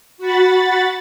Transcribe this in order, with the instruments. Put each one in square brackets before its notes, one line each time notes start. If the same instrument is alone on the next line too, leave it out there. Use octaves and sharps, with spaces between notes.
[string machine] F#4 F#5 B5 A6